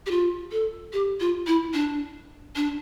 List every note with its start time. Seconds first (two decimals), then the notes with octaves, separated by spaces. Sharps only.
0.06 G4
0.11 F4
0.52 A4
0.93 G4
1.20 F4
1.47 E4
1.73 D4
2.56 D4